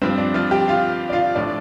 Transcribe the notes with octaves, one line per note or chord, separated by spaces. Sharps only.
G2 F3 C4
D4
F3 F4
G4 G5
F4 F5
D5
F4 F5
A2 F3 D4 D5